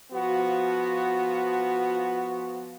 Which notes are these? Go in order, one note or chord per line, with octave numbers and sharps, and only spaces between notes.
F3 B3 F4 F#4